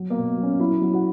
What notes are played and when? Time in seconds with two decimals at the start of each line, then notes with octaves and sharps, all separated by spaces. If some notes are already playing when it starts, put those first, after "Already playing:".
Already playing: F#3
0.10 A#3
0.16 B2
0.38 F#3
0.43 C#4
0.59 F#3 E4
0.82 F#3
0.93 F#4